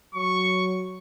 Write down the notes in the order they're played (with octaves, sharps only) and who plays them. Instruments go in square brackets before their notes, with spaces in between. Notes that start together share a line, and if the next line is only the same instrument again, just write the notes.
[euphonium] F#3 [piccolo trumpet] C#6